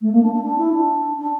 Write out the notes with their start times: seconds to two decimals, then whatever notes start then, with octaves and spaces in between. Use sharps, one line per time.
0.01 A3
0.12 A#3
0.22 D4
0.33 D4
0.43 D4
0.57 E4
0.72 D4
1.18 D4